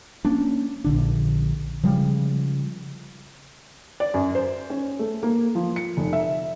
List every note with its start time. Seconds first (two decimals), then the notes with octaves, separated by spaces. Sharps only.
0.25 A#3 C#4 D4
0.84 A#1 D3 D4
1.83 C#3 F3 G3 G#3
4.00 D5
4.14 F#2
4.35 C5
4.70 C#4
4.99 A3
5.23 A#3
5.55 F3
5.76 C#7
5.97 F1
6.13 E5